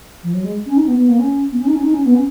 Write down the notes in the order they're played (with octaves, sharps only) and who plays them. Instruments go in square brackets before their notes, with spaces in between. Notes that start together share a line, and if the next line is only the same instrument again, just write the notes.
[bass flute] F3
F#3
G#3
C#4
D#4
B3
B3
A#3
C#4
B3
C#4
D#4
C#4
D#4
C#4
B3
C#4